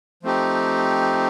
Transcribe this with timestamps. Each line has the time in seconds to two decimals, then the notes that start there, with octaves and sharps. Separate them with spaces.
0.23 F3 A3 C4 D#4 G4